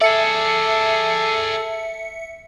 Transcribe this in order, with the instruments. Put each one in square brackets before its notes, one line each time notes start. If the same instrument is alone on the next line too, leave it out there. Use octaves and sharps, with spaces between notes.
[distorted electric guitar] G#4 D5 [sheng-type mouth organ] A4 [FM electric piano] E5 C#7